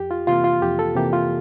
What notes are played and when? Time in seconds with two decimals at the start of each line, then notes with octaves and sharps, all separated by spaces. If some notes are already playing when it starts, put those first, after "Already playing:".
Already playing: F2 G4
0.11 F4
0.27 C3 E3 A#3 F4
0.44 F4
0.62 F2 G4
0.79 A4
0.95 C3 E3 A#3 G4
1.13 F4